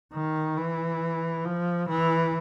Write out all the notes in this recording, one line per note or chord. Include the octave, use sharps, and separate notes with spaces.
D#3
E3
F3
E3